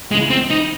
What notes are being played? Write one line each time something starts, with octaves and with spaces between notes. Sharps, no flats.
C#2 C#3 E3 G#3
C4
D#4